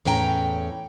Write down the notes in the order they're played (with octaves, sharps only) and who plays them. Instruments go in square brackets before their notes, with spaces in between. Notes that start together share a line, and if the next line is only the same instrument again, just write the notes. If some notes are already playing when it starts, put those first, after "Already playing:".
[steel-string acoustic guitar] E2 A2 C#4 G5 G#5 A#5